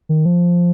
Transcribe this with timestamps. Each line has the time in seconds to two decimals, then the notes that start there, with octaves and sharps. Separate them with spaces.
0.09 D#3
0.26 F3